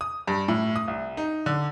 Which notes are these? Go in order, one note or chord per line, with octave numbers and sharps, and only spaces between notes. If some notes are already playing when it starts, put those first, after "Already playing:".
D#6
G2
A2
D#6
C2
D#4
D3